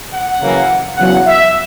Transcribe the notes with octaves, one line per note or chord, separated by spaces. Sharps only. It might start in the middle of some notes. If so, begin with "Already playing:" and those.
F#5
F#2 C#3 E3 A#3
E2 C#3 F#3 F#5
E5